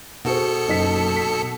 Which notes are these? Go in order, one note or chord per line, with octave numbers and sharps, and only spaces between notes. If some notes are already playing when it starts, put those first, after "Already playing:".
B2 F#4 G#4 A4 C5 C#7
F#1 D#4 B6
B6